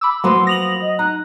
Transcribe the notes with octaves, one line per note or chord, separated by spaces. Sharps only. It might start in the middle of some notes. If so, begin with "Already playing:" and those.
B5 D6 E6
F3 F#3 A#3 B3 C6
D#6 A#6 F7 F#7
D#5
D#4 A#5 F#6